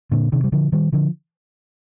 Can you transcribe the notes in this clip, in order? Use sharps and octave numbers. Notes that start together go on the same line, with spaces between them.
A#2 D3
C3 D#3
G3
D3 F3
D#3 G3
D3 F3